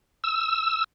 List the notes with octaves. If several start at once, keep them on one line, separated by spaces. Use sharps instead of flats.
E6